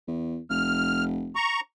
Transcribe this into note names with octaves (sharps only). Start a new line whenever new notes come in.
E2
F1 F6
A#5 C#6